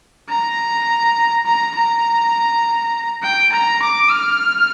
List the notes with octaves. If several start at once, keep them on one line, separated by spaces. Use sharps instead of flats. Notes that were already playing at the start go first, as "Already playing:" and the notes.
A#5
A#5
A#5
G5
A#5
D6
F6